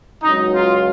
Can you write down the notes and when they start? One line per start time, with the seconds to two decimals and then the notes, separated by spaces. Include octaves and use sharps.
0.23 C#2 C#3 F#3 C#4 D#4
0.55 F4